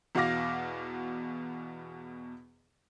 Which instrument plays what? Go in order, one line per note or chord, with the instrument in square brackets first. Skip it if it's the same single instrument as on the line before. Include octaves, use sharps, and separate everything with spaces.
[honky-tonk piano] E2 B2 F#4 F5 D6 A#6